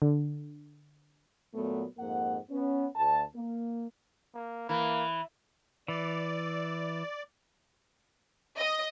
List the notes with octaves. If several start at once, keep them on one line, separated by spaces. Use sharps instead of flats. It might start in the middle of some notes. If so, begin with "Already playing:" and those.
D3
A#2 F#3 A3 B3
F2 G#2 A#3 F#5
B3 C#4
D2 A5
A#3
A#3
E3 A#3 B5
E3 D5
D#5